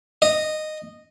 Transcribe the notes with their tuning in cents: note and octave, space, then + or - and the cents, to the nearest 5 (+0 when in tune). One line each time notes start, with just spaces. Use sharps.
D#5 -10